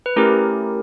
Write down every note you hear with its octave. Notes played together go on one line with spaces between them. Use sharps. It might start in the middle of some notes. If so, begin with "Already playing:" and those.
B4
A3 C#4 E4 G4 A#4